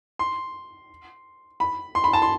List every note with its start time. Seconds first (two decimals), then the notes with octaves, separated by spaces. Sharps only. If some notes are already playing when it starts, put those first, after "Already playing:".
0.19 C6
1.60 B5
1.95 C6
2.04 B5
2.13 A5
2.22 C6